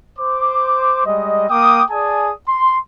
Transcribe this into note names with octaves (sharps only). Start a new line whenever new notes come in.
C5 D6
G3 G#3 D#5
A#3 G5 D6 D#6
G#4 D5 G#5 A5 D#6
C6